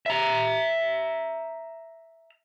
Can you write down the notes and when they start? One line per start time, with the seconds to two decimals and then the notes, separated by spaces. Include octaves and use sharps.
0.06 E5 A#5